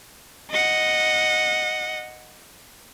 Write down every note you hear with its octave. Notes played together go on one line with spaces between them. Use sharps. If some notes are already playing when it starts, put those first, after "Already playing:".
D#5 F#5